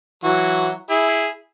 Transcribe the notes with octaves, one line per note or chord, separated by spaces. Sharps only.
E3 F#3 F#4
E4 G#4